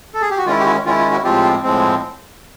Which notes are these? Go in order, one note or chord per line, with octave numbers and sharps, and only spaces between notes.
A4
G#4
G4
F#4
D#3 G#3 C#4 E4 F4
G4
E4 F#4
D#3 G#3 C#4 E4 F4
F4
E4 F#4
A2 F3 G#3 C4 F4 G4
A2 F3 G#3 C4